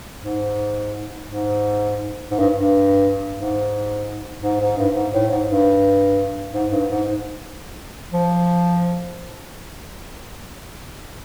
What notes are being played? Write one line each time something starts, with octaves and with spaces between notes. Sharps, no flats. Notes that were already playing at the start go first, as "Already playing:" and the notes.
G#2
G#2
G#2
G2
G2
G#2
G#2
G#2
G2
G#2
A2
G#2
G2
G#2
G2
G#2
F3